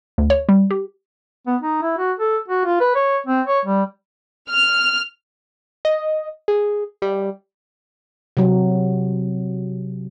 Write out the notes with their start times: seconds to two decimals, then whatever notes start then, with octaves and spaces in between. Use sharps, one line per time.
0.18 D2
0.30 C#5
0.49 G3
0.71 G4
1.47 B3
1.61 D#4
1.82 E4
1.98 F#4
2.19 A4
2.48 F#4
2.65 F4
2.80 B4
2.95 C#5
3.26 C4
3.47 C#5
3.65 G3
4.50 F6
5.85 D#5
6.48 G#4
7.02 G3
8.37 C3 F#3